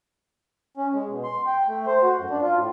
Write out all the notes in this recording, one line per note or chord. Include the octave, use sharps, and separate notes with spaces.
C#4
G#3
B2
C6
G5
A3
C5
F#4
F#2
D4
F4
A2